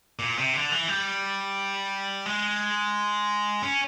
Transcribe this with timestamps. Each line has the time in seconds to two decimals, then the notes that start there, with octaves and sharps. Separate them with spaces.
0.19 A#2
0.38 C3
0.54 D3
0.72 E3
0.88 G3
2.26 G#3
3.63 C#4